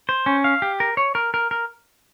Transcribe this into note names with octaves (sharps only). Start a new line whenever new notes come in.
C5
C#4
F5
G4
A#4
C#5
A#4
A#4
A#4